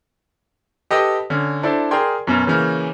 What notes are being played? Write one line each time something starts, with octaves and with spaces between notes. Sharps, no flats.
G4 A4 B4 D#5
D3 C#4
D4 E4 A4 C5 D5
G#4 A#4 D5 G5 C6 G#6
F#2 B2 C#4
C#3 E3 A#3 C#4